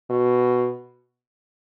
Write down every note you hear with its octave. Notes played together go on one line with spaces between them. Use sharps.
B2